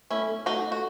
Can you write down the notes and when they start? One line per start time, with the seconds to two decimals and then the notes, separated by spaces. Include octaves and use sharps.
0.10 A3 C#4 E4
0.29 A3
0.46 A3 D#4 F#4
0.64 A3
0.72 F#4